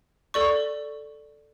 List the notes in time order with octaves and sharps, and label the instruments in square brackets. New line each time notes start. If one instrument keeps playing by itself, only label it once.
[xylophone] A4 D5 C#6